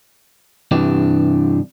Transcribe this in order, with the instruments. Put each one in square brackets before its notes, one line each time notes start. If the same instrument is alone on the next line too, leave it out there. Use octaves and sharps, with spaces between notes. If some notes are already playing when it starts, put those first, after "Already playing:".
[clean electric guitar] G2 C3 E3 D4 G4